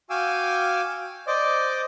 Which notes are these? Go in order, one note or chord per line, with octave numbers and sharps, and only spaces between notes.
F#4 F5 G5 G#5 D6 E6
C5 D5 D#5 D6